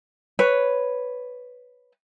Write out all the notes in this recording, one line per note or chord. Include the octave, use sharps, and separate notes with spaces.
B4 C#5